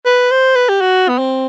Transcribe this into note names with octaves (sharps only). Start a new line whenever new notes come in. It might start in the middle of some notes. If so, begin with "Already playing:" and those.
B4
C5
B4
G4
F#4
B3
C4